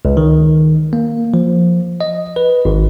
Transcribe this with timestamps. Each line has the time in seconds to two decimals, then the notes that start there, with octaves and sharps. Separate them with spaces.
0.05 C#2
0.17 D#3
0.93 A#3
1.34 F3
2.01 D#5
2.36 B4
2.65 G#1